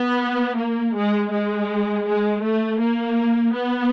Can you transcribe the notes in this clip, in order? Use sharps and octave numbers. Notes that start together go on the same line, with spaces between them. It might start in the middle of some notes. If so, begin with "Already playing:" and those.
Already playing: B3
A#3
G#3
G#3
G#3
A3
A#3
B3